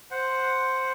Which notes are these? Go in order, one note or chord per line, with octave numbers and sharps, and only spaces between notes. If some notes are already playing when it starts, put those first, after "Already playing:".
C5 F#5